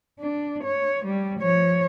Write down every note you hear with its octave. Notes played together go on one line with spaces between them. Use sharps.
D4
C#5
G3
F3 C#5